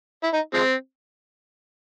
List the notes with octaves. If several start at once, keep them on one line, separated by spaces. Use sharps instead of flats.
E4
D#4
F3 G#3 C4